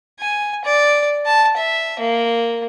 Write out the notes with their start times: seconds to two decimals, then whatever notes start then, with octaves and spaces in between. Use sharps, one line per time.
0.20 G#5
0.65 D5
1.26 A5
1.57 E5
1.99 A#3